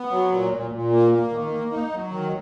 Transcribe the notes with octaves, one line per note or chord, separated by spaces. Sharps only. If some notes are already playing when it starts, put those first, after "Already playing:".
Already playing: B3
F#3
A#2
A#2
A#2
A#3
A#3
D#3
A#3
D#4
F#3
D#3